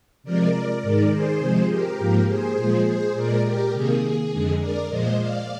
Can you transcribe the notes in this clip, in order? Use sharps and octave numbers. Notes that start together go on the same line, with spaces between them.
C3 F3 G#3 A#4 D5
G#2 D#3 G#3 A#4 D5
G#4 C5
C3 F3 G#3
G4 A#4
G#2 F3 A#3
G#4 C5
A#2 F3 G#3
G#4 C5
A#2 G#3 A#4 D5
G4 A#4
C3 D#3 A#3 G#4
F2 D3 G#3
A#4 D5
A#2 F3 G#3 C5 D#5
D5 F5